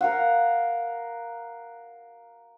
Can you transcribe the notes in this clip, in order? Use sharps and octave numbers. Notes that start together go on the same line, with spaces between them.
A#4 F5 F#5